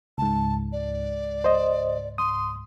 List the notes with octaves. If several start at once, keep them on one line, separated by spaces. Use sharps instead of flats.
C#2 G#2 A5
D5
C5 D#5
C6 D#6